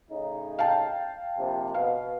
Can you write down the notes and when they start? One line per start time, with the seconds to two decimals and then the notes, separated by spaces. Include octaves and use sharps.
0.11 A2 C#3 D#4
0.59 F5 G5 A5
1.38 A#1 C3
1.74 B2 F5